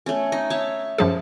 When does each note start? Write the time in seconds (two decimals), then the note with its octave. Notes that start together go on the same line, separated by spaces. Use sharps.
0.06 A3 C#4
0.32 D#4
0.50 C#5 E5 A5
0.98 F#2 F3 G#4 A5